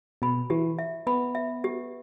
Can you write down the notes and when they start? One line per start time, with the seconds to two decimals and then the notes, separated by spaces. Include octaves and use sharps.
0.22 B2 B5
0.50 E3 G4
0.79 E5
1.07 B3 B5
1.35 E5
1.64 G4